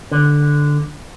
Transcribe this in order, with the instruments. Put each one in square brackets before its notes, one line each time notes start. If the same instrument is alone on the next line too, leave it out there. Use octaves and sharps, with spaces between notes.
[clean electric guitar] D3